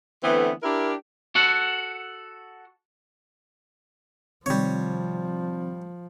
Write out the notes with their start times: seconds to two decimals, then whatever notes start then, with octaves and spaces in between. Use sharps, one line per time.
0.24 D3 E3 A3 B3 C4
0.62 D4 E4 G4 A#4
1.35 F#4 A4 F#5
4.46 C3 D#3 F3 G3 C4 C#5